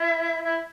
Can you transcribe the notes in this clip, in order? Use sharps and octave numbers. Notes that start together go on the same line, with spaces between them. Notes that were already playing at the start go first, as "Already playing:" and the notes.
Already playing: E4 E5
E4 E5